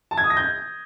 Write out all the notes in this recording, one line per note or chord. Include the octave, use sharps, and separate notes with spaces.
A5
G#6
D#6
A#6
G6